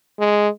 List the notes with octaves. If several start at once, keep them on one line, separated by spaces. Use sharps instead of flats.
G#3